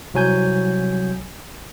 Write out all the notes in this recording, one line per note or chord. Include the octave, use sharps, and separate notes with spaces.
C2 F#3 G#5 G6